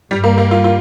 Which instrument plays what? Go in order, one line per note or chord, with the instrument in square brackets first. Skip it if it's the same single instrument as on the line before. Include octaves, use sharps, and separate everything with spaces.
[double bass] G2 [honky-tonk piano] G3
[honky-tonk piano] A#3
A#3
F4
F4